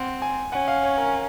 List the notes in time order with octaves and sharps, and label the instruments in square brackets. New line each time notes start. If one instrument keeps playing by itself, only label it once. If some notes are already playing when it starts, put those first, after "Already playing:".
Already playing: [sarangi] C4 [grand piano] F#5
[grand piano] G#5
[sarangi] C#4 [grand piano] F#5
[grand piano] F5
C#5
A#4